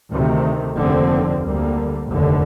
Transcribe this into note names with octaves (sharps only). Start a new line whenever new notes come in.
D2 C3 D#3 A3
F1 D#2 D3 F3 C4
D2 D3 G3 A#3
F1 D#2 D3